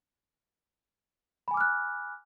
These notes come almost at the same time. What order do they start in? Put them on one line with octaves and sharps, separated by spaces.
B5 G#5 D6 F6 F#6